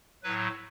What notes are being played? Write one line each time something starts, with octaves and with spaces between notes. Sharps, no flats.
A2 F#3 B4